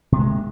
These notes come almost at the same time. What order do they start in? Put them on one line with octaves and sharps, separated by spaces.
C3 B3 G#3 A#3